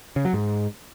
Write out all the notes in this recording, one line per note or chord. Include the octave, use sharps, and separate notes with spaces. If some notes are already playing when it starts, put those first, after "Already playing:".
C#3
F#3
G#2